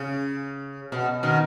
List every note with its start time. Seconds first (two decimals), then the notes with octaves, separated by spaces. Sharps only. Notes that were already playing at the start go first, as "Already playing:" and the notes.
Already playing: C#3
0.92 B2
1.23 B2 D#3